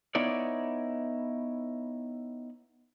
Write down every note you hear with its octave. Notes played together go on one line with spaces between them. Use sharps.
B3 D#4 E4 C#5 D5